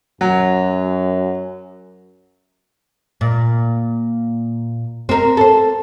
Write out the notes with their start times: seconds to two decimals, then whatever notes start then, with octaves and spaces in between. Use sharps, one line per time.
0.21 F#2 F#3
3.21 A#2
5.09 C4 A#4
5.37 A4 C5